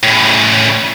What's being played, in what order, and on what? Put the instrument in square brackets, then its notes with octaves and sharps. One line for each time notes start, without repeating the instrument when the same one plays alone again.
[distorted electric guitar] A2 C#3